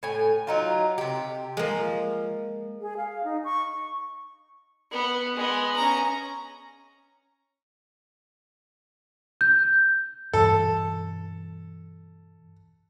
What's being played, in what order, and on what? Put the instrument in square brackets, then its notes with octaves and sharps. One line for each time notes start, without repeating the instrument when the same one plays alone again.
[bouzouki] A2 G#5
F#3 D#4 F4
C3 G4
[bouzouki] F3 [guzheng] G#3 A#3
[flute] G#4
F5
D#4
C#6
[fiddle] B3
G#3 B3
C#4 A#5
[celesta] G6
[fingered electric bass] G2 B2 E3 [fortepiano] A4